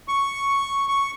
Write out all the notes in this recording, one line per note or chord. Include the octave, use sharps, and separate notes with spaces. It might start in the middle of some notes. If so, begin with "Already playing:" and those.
C#6
C#6